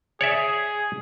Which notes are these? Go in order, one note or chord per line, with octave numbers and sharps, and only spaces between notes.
G#4 C#5 D5 E5